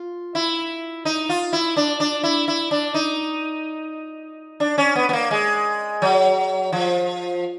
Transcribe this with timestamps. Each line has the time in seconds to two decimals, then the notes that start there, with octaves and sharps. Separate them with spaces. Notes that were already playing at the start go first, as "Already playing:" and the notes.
Already playing: F4
0.35 E4
1.05 D#4
1.29 F4
1.53 E4
1.77 D4
2.00 D4
2.24 E4
2.48 E4
2.71 D4
2.94 D#4
4.60 D4
4.78 C#4
4.95 B3
5.09 B3
5.13 A#3
5.31 G#3
6.02 F#3
6.72 F3